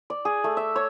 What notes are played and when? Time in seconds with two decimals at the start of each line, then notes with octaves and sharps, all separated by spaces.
0.10 D5
0.25 G#4
0.44 A3
0.57 E5
0.76 C#5